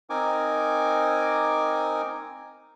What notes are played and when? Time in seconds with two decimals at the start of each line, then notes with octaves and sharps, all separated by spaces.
0.10 C4 D#4 A#4 G#5 D6